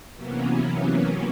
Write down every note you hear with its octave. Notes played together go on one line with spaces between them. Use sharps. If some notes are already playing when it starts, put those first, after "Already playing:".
C3 E3 F#3 A#3 B3 C#4